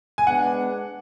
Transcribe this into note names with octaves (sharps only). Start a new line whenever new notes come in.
G#5
G#3 B3 D4 F#5